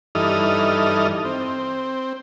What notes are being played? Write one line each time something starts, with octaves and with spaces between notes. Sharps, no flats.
G2 E3 D#4 A4 D#6 F6
C4